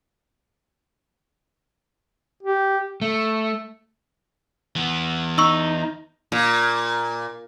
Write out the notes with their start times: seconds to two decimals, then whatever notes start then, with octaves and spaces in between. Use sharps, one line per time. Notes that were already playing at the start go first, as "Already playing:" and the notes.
2.43 G4
3.02 A3
4.76 E3 B3
5.38 D#4 C#6 E6
6.32 A#2